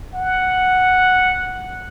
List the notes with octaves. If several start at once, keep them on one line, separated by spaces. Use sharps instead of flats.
F#5